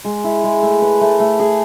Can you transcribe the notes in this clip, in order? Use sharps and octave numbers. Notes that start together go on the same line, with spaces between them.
G#3
E4
G#3
A3
B4
A3
A3
G#4